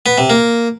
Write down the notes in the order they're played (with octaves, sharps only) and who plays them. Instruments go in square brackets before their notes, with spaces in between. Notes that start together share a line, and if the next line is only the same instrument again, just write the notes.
[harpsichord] B3
C3
A#3